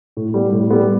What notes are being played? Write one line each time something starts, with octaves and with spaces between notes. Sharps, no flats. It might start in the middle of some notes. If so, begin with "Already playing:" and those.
A2
G3 B3
A2
G3 B3